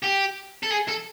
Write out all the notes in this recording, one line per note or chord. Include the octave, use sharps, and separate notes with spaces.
G4
A4
G#4
A4